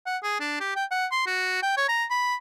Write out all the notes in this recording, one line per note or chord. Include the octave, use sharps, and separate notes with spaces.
F#5
G#4
D4
G4
G5
F#5
C6
F#4
G5
C#5
A#5
B5